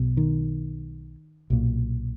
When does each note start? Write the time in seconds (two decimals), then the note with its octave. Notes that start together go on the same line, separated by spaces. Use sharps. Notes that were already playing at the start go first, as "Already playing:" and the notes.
Already playing: B1 B2
0.17 D#3
1.50 B1 A#2